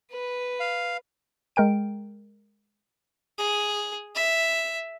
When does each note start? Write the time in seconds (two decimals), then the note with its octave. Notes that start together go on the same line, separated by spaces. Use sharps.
0.12 B4
0.60 F5
1.56 G#3 A#4 G5 D7
3.38 G#4
4.15 E5